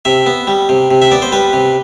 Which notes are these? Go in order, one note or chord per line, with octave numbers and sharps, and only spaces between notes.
C3 E5
B3
G3
C3
C3
E5
B3 D5
C5
G3 B4
C3